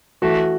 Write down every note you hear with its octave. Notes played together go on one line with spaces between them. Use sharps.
E3 A3 F#4